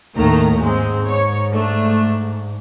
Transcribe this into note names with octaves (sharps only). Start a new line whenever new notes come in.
D#2 A2 D#3 A3 A#5
G#2 G#3 C4
C#5
A3 D4